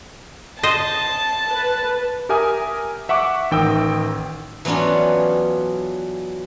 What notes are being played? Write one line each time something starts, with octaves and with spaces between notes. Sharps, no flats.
C5 D#5 A5
B4
G4 A#4 E5 G#5 D#6
E5 F#5 C#6 D6
A1 D#3 G5 D#6 E6
E3 F#3 B3 C#4 D4 F4